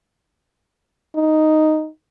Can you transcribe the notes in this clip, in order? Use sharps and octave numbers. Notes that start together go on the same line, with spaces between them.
D#4